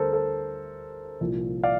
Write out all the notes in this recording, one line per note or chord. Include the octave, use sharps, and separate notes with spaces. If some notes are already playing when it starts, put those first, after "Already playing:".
Already playing: D2 D3 G3 A4 A#4 C5
A4
C2 A#2 F3
D5 F5